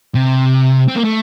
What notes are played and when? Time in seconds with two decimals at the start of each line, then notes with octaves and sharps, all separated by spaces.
0.15 C3
0.88 C4
0.95 A#3
1.04 A3